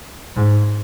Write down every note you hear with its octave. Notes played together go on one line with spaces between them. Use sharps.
G#2